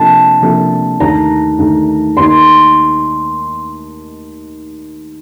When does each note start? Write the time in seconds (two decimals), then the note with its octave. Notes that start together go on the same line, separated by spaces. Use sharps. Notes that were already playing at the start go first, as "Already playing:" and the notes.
Already playing: C3 F3 A#3 D4 A4 A5
0.41 C3 F3 A#3 D4 A4
1.00 D#2 D3 A3 A#5
1.58 D#2 D3 A3
2.17 D#2 D#3 A#3 D#4 C6